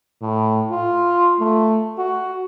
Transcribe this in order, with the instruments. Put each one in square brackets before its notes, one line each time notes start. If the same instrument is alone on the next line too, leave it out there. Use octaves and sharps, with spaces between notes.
[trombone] A2
F4
A3
F#4